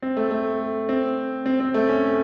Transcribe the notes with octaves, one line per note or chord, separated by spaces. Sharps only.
C4
A3
A3
C4
C4
C4
A3
C#4